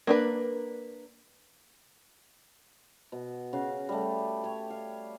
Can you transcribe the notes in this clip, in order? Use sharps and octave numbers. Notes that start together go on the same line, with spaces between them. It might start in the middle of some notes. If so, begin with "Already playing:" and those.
A#3 D4 B4
B2
C#3 F#4 F5
G3 A3
C#5 G5
F5